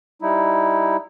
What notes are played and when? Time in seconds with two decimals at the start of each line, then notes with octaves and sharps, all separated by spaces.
0.22 G3 D#4 E4